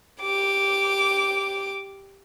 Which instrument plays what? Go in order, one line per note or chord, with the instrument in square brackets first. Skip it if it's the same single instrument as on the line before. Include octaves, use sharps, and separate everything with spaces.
[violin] G4 D6